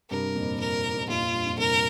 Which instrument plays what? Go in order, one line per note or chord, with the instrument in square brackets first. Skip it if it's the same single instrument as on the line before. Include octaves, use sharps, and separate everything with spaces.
[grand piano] G2 C3 [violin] A#4
[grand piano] F2 A#2
[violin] A#4
[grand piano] F2
G2
[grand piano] F2 A#2 [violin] F4
[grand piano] F2
G2
F2 A#2
[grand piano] G2 C3 [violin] A#4